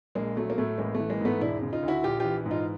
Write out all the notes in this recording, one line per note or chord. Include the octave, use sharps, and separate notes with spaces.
A#1 G#3 A#3
F#3 A3
A#3
A2 A3
A1 G#3 A#3
E3 A3
G#3 A#3
G#2 A3 B3
E1 D4 E4
C#3
D#4 F4
D2
E4 F#4
A#1 F4 G4
E3 F4 G4
G#2
D#4 F4